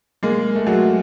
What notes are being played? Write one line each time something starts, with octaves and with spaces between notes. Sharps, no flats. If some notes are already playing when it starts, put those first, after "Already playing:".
G#3 A#3
A3
F#3 G#3